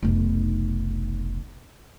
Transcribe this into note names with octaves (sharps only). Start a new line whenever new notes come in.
F1 B1